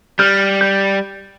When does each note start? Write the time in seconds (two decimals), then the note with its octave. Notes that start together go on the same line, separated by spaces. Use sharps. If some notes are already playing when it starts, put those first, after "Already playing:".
0.19 G3 F6 G6
0.61 G6